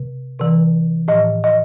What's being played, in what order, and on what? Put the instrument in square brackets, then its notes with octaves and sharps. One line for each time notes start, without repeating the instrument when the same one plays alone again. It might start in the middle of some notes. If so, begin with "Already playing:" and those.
Already playing: [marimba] C3
C3 E3
A2 F3 D#5
D#5